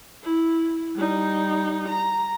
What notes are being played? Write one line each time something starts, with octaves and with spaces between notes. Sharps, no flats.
E4
G3 D#4
A#5